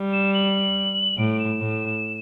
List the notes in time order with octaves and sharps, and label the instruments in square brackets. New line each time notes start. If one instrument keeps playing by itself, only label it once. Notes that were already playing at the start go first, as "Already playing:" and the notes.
Already playing: [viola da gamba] G3
[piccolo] E7
F#7
[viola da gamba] A2 [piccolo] D7
[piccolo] E7
[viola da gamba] A2